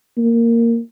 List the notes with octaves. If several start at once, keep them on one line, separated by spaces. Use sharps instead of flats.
A#3